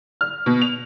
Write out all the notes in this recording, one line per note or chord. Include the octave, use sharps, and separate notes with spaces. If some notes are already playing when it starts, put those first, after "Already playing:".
F6
B2
F7